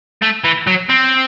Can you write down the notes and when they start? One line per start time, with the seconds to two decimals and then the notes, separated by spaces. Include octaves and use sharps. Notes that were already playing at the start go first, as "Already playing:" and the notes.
0.22 A3
0.44 E3
0.67 F#3
0.89 C4